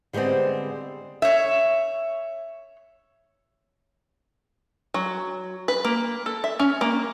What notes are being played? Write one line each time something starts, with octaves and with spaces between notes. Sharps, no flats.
D3 G3 G#3 B3 C4
C#5 E5
F#3
B4
A#3
A4
E5
C#4
A#3